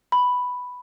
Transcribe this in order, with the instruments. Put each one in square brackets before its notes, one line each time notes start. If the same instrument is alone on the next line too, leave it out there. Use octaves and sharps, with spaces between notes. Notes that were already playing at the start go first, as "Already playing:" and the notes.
[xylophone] B5